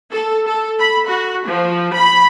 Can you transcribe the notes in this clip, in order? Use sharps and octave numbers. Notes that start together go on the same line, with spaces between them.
A4
A4
B5
F#4
F3
B5